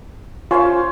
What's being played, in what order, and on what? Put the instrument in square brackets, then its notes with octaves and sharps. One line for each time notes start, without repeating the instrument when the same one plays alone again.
[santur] C#4 C5 F5 [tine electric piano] F4